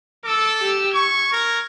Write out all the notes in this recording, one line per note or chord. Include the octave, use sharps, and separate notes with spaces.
A4 D6 E6
G4 E6
C#6 G#6
A#4